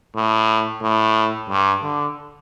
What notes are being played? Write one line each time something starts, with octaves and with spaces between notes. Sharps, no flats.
A2
A2
G2
D3